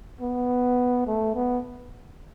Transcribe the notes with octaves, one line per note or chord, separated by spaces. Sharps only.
B3
A3
B3